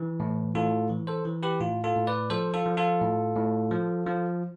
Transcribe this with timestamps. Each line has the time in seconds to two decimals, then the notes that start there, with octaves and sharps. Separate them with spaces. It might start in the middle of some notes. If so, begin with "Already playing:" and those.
Already playing: E3
0.20 A2
0.55 A2 F4 A4
0.90 E3
1.07 A4 C5
1.25 E3
1.43 G4 B4
1.60 A2 F4
1.84 F4 A4
1.95 A2
2.07 B4 D5
2.30 F3 A4 C5
2.54 F4 A4
2.66 F3
2.77 F4 A4
3.01 A2
3.36 A2
3.71 F3
4.06 F3